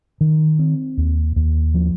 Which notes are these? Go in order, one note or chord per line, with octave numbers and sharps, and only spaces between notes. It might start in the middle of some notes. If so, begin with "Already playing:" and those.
D#3
C4
D#2
D#2
F3